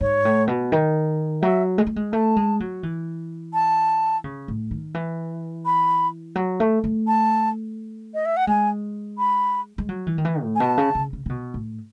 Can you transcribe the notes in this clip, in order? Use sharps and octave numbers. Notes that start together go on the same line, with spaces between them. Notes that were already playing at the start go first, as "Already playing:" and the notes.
G#2 C#5
A2
B2
D#3
F#3 E5
G#3
A3
G#3
A3 A5
G#3
F#3
E3
A5
C#3
A2
D#3
E3
B5
F#3
A3
A3
A5
D#5
E5
F#5
G#3 G#5
B5
G#3
F#3
E3
D#3
E3
A2
G#5
B2 A5
C#3
C#3
C#3
C#3
B2
A2